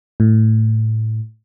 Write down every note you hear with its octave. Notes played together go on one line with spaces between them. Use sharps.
A2